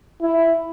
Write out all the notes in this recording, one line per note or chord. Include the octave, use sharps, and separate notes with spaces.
E4